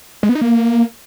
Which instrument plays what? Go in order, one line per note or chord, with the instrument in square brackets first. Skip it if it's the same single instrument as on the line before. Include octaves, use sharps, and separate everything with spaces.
[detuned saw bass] G#3
B3
D#4
A#3